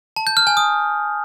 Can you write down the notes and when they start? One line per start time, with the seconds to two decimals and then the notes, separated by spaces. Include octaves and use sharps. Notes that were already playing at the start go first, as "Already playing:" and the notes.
0.16 A5
0.27 G6
0.37 F6
0.47 G#5
0.57 D#6